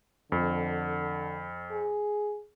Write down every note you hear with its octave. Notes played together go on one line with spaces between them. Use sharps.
F2 D3
G#4